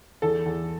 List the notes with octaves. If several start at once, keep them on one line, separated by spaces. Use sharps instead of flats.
E2 A4
E2